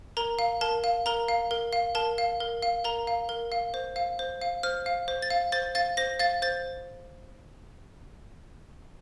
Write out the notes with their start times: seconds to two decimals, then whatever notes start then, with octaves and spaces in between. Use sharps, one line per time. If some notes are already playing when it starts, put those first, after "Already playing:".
0.17 A#4 A#5
0.39 F5
0.61 A#4 A5
0.84 F5
1.06 A#4 A#5
1.28 F5
1.51 A#4
1.73 F5
1.95 A#4 A5
2.18 F5
2.40 A#4
2.62 F5
2.84 A#4 A#5
3.07 F5
3.29 A#4
3.52 F5
3.74 C5
3.96 F5
4.19 C5
4.42 F5
4.63 C5 F6
4.86 F5
5.08 C5
5.22 A6
5.30 F5
5.52 C5 A6
5.75 F5 A6
5.97 C5 A#6
6.19 F5 A6
6.42 C5 A6